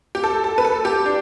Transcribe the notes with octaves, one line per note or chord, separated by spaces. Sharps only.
G4
A4
A4
B4
A4
G4
D4